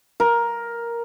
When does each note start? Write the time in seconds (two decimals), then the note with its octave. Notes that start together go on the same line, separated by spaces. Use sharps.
0.20 A#4